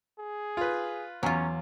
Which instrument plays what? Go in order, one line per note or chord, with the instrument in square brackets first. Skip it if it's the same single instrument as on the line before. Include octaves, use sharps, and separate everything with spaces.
[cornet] G#4
[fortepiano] F4 B4
[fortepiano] E2 [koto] F#3 F4 [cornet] C#4